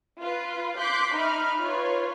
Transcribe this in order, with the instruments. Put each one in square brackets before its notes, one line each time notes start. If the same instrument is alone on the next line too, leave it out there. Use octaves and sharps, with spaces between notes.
[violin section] F4 B4
C6 D6 F#6 G6 B6
D#4 E5 B5 F6
F4 B4 C#5